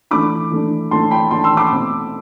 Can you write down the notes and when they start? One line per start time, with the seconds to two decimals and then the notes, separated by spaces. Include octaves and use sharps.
0.11 E3 A3 D4 B5 D6
0.51 E3 A3 D4
0.91 E3 A3 D4 A5 C6
1.11 G5 B5
1.31 E3 A3 D4 A5 C6
1.44 C6 E6
1.57 B5 D6
1.71 B2 A3 C4